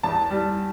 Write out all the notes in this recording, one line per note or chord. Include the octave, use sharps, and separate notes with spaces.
E2 A5
G3